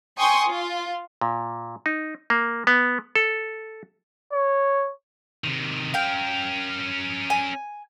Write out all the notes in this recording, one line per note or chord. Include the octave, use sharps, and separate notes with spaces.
G5 G#5 C6 C#6 D#6
F4
A#2
D#4
A#3
B3
A4
C#5
C3 D#3
C#4 A#4 F5 G5
G#5